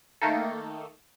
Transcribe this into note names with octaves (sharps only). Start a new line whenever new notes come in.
D#3 A3 A#3 D#4 A4